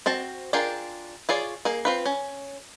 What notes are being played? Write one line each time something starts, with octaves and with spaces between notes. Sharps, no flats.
C4 F#4 A5
D4 F4 G#4 A#4 G5
F4 G#4 C#5 D5
A#3 G#4
C4 F4 B4
C#4